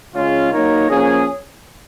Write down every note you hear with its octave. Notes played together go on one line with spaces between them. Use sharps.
C#3 G#3 C#4 F4
F#3 A#3 D#4 A#4 C#5
F3 A#3 C#4 G#4